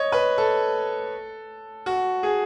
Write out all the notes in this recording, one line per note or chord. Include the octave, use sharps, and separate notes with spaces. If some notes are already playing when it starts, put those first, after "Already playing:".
Already playing: C#5 D#5
B4
A4
F#4
G#4